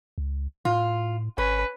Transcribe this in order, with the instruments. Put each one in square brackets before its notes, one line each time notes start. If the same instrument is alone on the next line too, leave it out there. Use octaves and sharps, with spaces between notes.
[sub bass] C#2
[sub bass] A2 [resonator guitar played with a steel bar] F4
[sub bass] G#1 [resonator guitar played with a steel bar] C#4 [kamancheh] B4